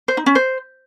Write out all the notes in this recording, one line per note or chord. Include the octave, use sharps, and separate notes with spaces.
C5
D#4
C#4
C5